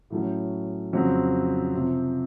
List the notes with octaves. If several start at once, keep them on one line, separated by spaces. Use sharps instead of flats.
A2 F#3 A3 C#4
F2 C#3 F#3 C4
C3 F3 C4